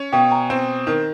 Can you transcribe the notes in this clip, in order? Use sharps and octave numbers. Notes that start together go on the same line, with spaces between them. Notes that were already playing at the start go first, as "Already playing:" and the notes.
Already playing: C#4
B2 F5 G5
G#5 A#5
C4
D#3